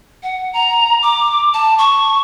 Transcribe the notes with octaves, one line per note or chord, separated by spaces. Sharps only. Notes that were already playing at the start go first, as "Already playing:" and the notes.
F#5
A#5
D6
A5
C#6